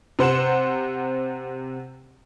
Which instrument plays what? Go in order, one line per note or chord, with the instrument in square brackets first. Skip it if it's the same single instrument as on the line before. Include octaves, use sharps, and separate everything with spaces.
[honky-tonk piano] C3 C5 F#5 E7